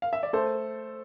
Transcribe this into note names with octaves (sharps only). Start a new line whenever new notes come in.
F5
E5
D5
A3 A4 C5